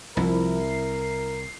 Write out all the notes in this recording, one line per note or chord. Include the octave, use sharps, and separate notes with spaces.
C2 F3 E4 A#4
C7